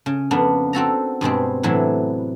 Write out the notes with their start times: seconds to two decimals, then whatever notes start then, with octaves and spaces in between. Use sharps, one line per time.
0.06 C#3
0.31 F2 C#3 A#3 B3 D4
0.73 C4 F#4 A4 A#5
1.21 G2 B2 G#3 C4
1.63 A2 C3 E3 F#3 D4 E4